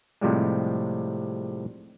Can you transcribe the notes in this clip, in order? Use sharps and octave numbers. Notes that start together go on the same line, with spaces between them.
A2 C3 F3 G3 G#3